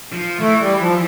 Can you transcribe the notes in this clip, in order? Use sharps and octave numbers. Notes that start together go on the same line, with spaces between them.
F3
E3 A3
G3
F3